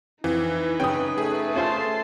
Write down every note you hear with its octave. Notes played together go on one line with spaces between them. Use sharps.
F2 E3 D#4 B4
F#2 C#3 C#4 G5 D#6
A3 G#4
C#4 F4 C5 A5 C6